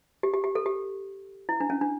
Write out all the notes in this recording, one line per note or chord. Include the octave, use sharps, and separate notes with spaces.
G4
G4
G4
A4
G4
E4
D4
C#4
D4